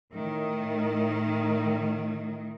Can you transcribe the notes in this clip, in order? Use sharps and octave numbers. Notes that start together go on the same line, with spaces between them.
A2 D#3